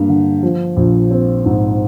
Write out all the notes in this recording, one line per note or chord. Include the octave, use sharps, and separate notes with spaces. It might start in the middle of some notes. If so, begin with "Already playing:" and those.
Already playing: G2 A#3
D3
F3
A#1
C4
G#2